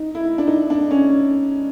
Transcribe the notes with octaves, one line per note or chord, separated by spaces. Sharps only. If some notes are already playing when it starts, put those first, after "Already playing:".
Already playing: D#4
E4
D4
D#4
D4
C#4